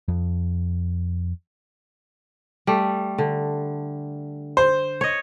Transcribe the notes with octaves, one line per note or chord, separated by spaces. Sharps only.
F2
G3 A3
D3
C5
C#5 D#5